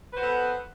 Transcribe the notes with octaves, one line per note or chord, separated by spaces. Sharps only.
B3 F#4 A4 B4 C5